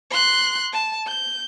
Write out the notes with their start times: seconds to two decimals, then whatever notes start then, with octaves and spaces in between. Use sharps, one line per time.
0.11 C6 F#6
0.73 A5
1.07 G6